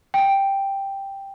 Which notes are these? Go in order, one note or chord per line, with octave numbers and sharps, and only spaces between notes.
G5